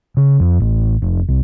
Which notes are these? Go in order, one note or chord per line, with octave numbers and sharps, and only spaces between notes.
C#3
F2
A1
F1
C2